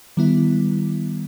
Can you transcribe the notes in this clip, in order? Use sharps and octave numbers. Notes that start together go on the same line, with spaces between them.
D#3 G3 B3 E4